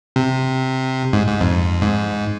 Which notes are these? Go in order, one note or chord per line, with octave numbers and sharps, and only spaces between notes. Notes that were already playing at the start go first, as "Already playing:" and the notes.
C3
G#2
G#2
F2
G#2